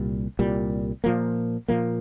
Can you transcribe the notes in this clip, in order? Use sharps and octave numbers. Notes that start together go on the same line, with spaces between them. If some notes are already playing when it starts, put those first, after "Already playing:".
Already playing: C2 A#2 G3
C2 A#2 G3
A#2 F3 A#3
A#2 F3 A#3